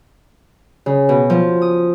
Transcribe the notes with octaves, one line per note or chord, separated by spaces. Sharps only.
C#3
B2
F3
D#6